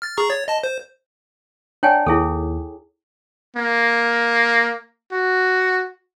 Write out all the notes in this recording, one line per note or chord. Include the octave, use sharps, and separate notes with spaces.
F6 A6
G#4 A#5 C#6
C#5 A6
D#5 A5
C5
D4 C#5 G5 G#5
D#2 E4 G#4 A4
A#3
F#4